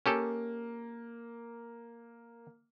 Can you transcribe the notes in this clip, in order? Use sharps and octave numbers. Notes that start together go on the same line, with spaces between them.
A#3 C#4 G4 A4